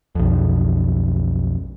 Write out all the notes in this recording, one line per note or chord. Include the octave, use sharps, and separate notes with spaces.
B1 F2